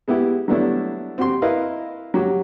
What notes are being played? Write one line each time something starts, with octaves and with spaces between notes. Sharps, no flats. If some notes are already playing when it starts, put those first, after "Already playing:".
G#3 B3 E4 G4
F#3 G3 A3 B3 D4 E4
C4 F#4 G4 C6
E4 A#4 B4 D#5 F5
F#3 F#4 G4